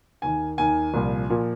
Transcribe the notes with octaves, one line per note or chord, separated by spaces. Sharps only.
D#2 D#3 G#5
D#2 D#3 G#5
C2 A#2 F3
A#2 F3